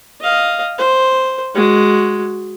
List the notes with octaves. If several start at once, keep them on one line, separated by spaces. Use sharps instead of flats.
D#5 F5
C5
G#3 F#4